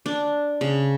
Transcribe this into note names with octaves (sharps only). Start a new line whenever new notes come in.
D4
C#3